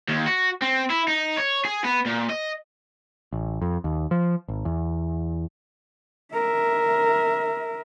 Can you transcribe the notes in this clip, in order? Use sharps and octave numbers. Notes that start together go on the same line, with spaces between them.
D#2
F#4
C4
E4
D#4
C#5
G#4
B3
A#2
D#5
A1
F2
D#2
F3
G#1
E2
A#4 E5